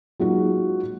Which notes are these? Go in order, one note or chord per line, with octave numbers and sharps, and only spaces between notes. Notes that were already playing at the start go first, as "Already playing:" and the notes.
F#3 G#3 A#3 D#4 F4 F#4